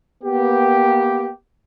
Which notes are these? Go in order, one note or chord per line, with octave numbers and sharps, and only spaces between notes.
A#3 B3 G4